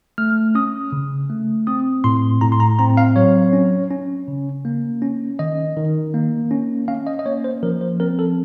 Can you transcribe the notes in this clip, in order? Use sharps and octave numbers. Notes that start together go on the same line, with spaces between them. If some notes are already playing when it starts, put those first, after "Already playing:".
A3 F6
C#4 D#6
C#3
A3
C4 D#6
A2 C6
A2 A#5
C6
A#5
C4 A#5
F5
F#3 C#5
C#4
C#4
C#3
A#3
C#4
D#3 D#5
D#3
A#3
C#4
C#4 F5
D#5
D#5
A#3 C#5
C5
F3 A#4
C5
C4 A#4
A4